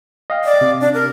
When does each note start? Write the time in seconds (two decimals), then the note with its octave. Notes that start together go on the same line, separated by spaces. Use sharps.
0.30 D#5 F5 G5
0.45 D5
0.61 C3
0.81 D4
0.94 A#4